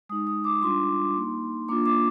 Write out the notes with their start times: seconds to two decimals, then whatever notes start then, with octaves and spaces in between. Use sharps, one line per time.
0.09 G#3 D#4 D#6
0.27 D#6
0.44 D6
0.55 D6
0.62 G3 D4 F4 C6
1.16 A#3 D#4
1.68 A#3 D4 F4 D6
1.86 D6